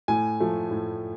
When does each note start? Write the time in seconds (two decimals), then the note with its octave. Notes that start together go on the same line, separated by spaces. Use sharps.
0.08 A2 G#5
0.40 F3 A3
0.71 A2